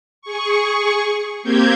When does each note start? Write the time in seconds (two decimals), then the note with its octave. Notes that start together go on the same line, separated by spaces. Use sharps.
0.22 G#4 C#6
1.43 A#3 C4 G4 G6 G#6